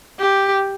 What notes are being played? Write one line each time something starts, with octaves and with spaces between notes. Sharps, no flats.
G4